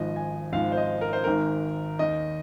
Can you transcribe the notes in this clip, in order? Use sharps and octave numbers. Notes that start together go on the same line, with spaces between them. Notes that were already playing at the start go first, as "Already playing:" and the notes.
Already playing: G#1 G#2 F3 D#5
G#5
G#1 G#2 F3 F5
C5
D#5
A#4
C5
G#1 G#2 D#3 A#4
D#2 D#3 D#5